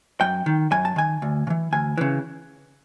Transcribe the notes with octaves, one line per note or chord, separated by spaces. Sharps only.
F#2 G5
D#3
F#2 G#5
A5
D#3 G#5
D2
C#3
E3
D2 G#5
C#3 E3